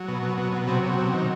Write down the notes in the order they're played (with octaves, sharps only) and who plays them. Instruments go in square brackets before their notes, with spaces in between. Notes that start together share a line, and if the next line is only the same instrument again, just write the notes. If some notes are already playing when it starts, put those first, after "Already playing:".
Already playing: [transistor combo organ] F#3
B2
B2
B2
B2
C3 F#3
C3
C3
D#3